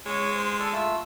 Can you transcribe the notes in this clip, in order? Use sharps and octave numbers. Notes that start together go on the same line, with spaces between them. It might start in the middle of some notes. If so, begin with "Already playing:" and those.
G#3 C#5
C5
A4 D5
A3 F4 E6